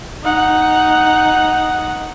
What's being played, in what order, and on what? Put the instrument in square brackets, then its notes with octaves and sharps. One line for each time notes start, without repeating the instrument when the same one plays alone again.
[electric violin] D#4 F#5